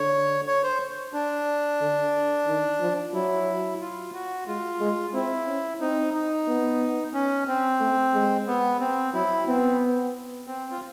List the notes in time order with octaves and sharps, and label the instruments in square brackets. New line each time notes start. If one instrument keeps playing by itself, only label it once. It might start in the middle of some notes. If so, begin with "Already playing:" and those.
Already playing: [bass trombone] D3 [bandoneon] C#5
[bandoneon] C#5
C5
D4
[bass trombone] D3
D#3
F3
[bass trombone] F#3 [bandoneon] E4
[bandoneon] F4
F#4
[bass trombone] G#3 [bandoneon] F4
[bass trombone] G#3
[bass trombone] C4 [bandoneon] E4
[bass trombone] C#4
[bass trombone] C4 [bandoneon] D#4
[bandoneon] D#4
[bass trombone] B3
[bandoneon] C#4
C4
[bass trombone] A3
G#3
[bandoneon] B3
C4
[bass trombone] F#3 [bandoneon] E4
[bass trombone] B3 [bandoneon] C4
[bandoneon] C4
F4